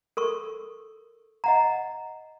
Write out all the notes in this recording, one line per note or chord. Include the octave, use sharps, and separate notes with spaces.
A4 A#4 C#6
D#5 F#5 A#5